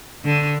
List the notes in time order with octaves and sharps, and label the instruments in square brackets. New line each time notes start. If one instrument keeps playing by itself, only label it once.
[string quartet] D3